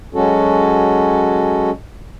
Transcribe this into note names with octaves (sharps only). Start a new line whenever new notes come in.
F#3 G#3 C#4 F#4 A4